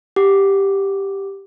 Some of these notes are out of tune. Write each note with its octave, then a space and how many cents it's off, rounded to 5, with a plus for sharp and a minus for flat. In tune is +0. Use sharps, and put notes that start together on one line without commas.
G4 +0 F#5 +0 D6 +0